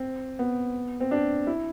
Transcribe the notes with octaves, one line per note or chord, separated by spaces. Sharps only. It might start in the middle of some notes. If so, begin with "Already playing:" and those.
Already playing: C4
B3
C4
D4
E4